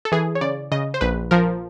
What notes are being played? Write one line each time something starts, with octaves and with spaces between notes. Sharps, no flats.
A4
E3 G#4
C#5
C#3 D5
C#3 D#5
C5
A#1 B4
F3 A#4